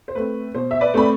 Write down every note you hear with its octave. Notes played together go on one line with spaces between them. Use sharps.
C5
A3 C4 B4
B2 C5
E5
B4 D5
A3 C4 B5